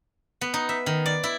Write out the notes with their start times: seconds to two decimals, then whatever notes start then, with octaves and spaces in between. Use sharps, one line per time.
0.41 B3
0.54 D#4
0.69 E5
0.86 D#3
1.06 D5
1.23 E4